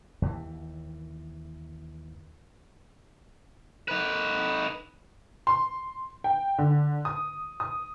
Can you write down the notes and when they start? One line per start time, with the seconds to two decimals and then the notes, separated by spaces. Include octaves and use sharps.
0.22 D#2 E3
3.88 D#4 B4
5.47 C6
6.24 G5
6.58 D3
7.05 D#6
7.60 D#6